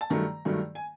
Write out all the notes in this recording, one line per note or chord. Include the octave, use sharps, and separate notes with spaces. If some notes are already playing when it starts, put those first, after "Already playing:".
A5
G2 D#3 F#3 A3 A#5
G2 D#3 F#3 A3
G#5